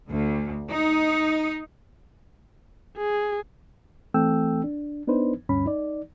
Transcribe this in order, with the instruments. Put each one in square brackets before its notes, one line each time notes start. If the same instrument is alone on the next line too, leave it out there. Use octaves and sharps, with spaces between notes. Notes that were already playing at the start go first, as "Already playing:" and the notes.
[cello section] D2
D#4
[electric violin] G#4
[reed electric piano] E3 A3 C4 A4 G5 E6
D4
B3 D4 D#4 B4 C5
D2 G2 C#4 B5
D#4 D5